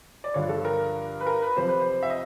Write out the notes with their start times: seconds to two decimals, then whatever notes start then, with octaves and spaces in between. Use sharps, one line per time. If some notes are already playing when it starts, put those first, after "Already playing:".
0.24 D5
0.34 G2 D3 F3 C#5
0.49 A4
0.65 A#4
1.20 B4
1.27 A#4
1.42 B4
1.56 F2 C3 F3 C5
1.68 B4
1.80 C5
2.03 E5
2.10 D#5